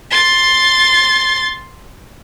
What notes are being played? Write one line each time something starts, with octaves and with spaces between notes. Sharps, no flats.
C6 A6